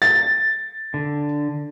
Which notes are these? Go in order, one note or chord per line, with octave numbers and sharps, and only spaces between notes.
A6
D3